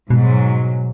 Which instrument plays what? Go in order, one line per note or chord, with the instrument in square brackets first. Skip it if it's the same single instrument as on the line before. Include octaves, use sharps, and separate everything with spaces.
[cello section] G#2 F#3 [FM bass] B2